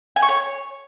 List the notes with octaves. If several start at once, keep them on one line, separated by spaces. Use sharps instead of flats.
G#5
C#6
C#5